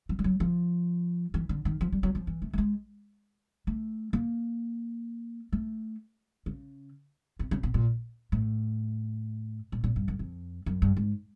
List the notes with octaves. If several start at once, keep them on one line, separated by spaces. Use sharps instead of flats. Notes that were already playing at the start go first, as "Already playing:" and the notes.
F3
G3
F#3
F3
E3
D3
D#3
F3
G3
F#3
F3
E3
A3
A3
G#3
A3
A#3
A3
C#3
C3
C#3
B2
A#2
A2
A#2
A#2
G2
F#2
F2
F#2
G2
G#2